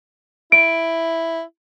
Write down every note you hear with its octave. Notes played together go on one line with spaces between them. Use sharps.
E4 D7